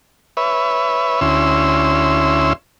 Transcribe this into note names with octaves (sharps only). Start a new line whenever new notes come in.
B4 C#5 E5
D2 C#4 E4 C6 E6